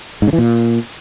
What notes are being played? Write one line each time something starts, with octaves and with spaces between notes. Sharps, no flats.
G#2
C#3
E3
A#2